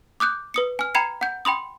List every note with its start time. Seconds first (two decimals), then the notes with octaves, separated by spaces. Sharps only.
0.20 D6 D#6 F#6 G6
0.54 B4 D#6 C#7
0.79 G#5 F6
0.95 G5 A#5 B5 G#6 C7 C#7
1.21 F#5 G6
1.45 G5 B5 C6 D#6